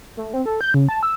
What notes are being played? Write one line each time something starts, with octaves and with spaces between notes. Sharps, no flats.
A3
C4
A4
G6
C#3
A5
E6